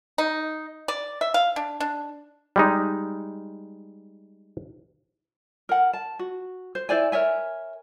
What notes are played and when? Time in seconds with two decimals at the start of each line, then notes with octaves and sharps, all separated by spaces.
0.18 D#4
0.88 D5
1.21 E5
1.34 F5
1.56 D4
1.80 D4
2.56 G3 G#3 D#4
5.69 A#4 F#5
5.93 A5
6.19 F#4
6.75 C5
6.89 E4 C5 D5 G#5
7.12 A#4 C#5 E5 G#5